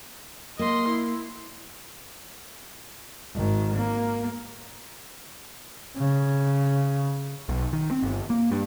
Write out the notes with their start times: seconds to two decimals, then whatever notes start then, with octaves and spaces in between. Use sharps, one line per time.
0.59 A#3 D#5 C6
0.89 E4
3.34 G#1 D#3
3.76 A#3
5.97 C#3
7.49 B1
7.73 D#3
7.91 C4
8.03 G1
8.30 A#3
8.52 G2